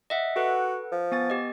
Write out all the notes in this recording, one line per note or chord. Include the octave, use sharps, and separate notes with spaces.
D#5 E5 F#5
F#4 A4 B4 F#5
F3
B3 G#5 A6
G4 D#5